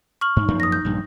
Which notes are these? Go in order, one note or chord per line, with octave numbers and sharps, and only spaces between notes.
C#6 F6 F#7
G#2 D#4
F#2 F3 A#3
D#6 A#6
G6
A#1 G2